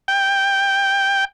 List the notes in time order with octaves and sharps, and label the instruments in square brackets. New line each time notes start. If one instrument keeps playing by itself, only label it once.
[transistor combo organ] G5